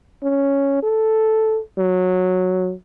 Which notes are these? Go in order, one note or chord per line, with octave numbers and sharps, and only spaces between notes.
C#4
A4
F#3